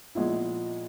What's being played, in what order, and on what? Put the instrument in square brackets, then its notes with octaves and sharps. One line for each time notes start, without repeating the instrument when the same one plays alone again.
[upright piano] A#2 F3 G#3 B3 E4